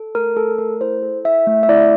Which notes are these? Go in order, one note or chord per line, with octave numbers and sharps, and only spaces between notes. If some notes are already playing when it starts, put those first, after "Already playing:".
Already playing: A4
A3 A#4
A3 A4
A3 A#4
E4 C5
A4
E4 E5
A3
E5
E4 D5